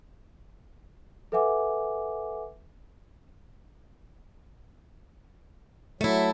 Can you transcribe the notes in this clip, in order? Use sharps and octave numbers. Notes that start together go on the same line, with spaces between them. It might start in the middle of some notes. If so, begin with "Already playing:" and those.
A4 B4 E5 F#5 G#5 D6
F#3 A3 E4